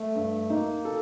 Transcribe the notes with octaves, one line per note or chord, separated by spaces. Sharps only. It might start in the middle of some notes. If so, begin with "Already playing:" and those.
Already playing: A3
G2
A#3 D#4
A4